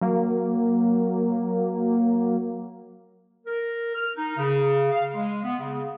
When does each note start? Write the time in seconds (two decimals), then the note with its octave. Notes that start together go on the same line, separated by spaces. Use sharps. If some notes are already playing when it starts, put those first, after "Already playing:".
0.01 F#3 A#3
3.46 A#4
3.94 F6
4.15 D#4
4.37 C#3
4.91 F5
5.14 G#3
5.43 B3
5.59 C#3